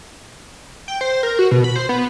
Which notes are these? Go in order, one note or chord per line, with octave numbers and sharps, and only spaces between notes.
G5
C5
A#4
F#4
B2
B5
C5
B3